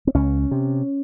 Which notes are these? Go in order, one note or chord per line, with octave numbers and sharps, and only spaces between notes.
C4
C#2 C#4
C3